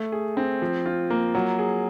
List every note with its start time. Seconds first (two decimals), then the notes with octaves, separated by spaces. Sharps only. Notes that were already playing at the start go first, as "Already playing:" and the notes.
Already playing: A3
0.12 G#4
0.37 C4
0.62 F3
0.86 F4
1.10 A#3
1.35 F#3
1.59 G#4